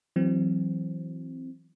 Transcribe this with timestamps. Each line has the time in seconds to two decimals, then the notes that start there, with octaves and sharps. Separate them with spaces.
0.16 E3 F#3 C4